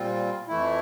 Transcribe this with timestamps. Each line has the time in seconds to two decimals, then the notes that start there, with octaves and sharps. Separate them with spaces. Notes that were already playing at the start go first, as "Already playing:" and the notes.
Already playing: A#2 G3 C4 F4
0.48 F2 E3 A3 E4